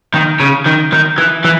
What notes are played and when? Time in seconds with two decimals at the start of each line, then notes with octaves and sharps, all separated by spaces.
0.14 D#3
0.40 C#3
0.66 D#3
0.93 D#3
1.18 E3
1.44 E3